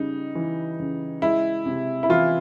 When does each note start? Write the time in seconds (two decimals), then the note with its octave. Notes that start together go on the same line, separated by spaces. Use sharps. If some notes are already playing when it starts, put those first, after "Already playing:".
Already playing: C#3 G3 D#4
0.35 E3
0.79 C#3
1.22 G#3 E4
1.66 C3
2.03 E4
2.09 E3 F4